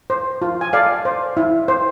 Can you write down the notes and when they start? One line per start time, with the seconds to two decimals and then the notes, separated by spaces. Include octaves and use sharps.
0.10 C5
0.42 F4
0.61 G#5
0.73 A4 D5 F5
1.05 C5
1.37 E4
1.68 C5